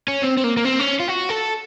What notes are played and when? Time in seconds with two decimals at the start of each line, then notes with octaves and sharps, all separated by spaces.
0.08 C#4
0.22 C4
0.37 C4
0.44 A#3
0.57 A#3
0.65 C4
0.80 C#4
1.00 F4
1.08 F#4
1.30 A4